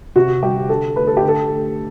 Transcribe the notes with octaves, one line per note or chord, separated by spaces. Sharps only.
C3 F#4
G3 G4
D3 A4
A3 B4
A4
G4
D3
A4
A3